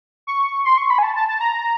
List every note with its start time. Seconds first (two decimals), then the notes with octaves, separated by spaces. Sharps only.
0.27 C#6
0.65 C6
0.78 C#6
0.90 B5
0.98 G#5
1.03 A5
1.16 A5
1.28 A5
1.41 A#5